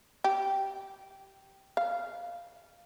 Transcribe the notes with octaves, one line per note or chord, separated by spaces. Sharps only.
G4
F5